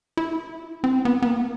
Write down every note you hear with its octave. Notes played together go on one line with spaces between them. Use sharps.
E4
C4
B3
B3
A#3